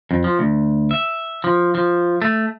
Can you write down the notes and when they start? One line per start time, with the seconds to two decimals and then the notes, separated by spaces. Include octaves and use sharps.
0.11 F2
0.24 F3
0.39 D2
0.91 E5
1.44 F3
1.75 F3
2.22 A3